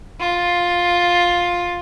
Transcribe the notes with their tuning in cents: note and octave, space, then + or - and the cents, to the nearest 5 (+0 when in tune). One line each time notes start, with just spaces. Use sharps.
F4 +10